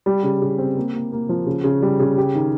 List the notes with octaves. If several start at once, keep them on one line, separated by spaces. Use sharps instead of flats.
G3
C#3
C#3
C4
A#3
A#3
A#3
F3
C#3
C#3
G3
C#3
G4
D#3